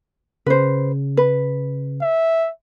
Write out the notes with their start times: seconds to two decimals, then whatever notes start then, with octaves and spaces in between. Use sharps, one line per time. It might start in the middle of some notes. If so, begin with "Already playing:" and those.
0.46 C#3 B4 C5
1.17 B4
2.02 E5